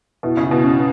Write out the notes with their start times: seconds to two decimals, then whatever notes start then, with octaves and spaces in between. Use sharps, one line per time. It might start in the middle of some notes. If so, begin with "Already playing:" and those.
0.23 B2 E4
0.37 C#3
0.44 E4
0.51 B2
0.64 C#4